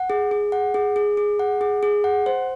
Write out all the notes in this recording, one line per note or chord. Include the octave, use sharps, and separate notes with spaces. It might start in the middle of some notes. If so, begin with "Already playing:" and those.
Already playing: F#5
G#4
G#4
F#5
G#4
G#4
G#4
F#5
G#4
G#4
F#5
C5